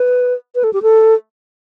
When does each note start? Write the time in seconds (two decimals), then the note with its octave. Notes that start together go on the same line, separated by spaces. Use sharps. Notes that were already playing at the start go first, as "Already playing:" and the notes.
Already playing: B4
0.55 B4
0.64 A4
0.73 G4
0.82 A4